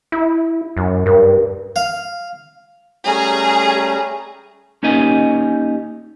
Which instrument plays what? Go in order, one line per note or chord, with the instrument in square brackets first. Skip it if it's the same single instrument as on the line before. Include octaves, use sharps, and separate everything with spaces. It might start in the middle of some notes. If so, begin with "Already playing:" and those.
[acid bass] E4
F#2
[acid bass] G2 [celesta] A#4
[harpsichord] F5
[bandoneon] G3 A3 C#4 [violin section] G#4 A#5
[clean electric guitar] A#3 C#4 D#4 G4 D#5 G#5